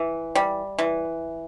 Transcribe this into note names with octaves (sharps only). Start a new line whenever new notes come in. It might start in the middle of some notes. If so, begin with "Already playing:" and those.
Already playing: E3
G3
E3